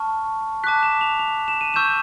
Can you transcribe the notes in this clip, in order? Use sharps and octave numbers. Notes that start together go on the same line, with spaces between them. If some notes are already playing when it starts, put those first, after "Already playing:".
Already playing: A5 C#6 F6
A5 D6 F#6 B6
E7
F7
F7
E7
D#7
C#6 E6 G6 E7